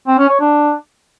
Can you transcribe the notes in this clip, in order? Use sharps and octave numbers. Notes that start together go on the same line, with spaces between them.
C4
C#4
C#5
D4